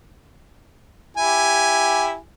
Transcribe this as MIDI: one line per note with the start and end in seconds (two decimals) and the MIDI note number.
1.17 2.16 64
1.17 2.16 67
1.17 2.16 80